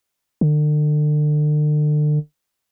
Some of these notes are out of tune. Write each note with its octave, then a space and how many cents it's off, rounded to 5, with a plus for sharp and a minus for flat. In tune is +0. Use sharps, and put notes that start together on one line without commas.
D3 +35